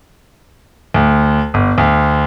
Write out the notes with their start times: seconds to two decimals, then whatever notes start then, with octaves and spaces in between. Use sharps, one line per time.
0.94 D2
1.54 G1
1.78 D2